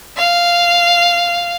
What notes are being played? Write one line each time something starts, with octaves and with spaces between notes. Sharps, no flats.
F5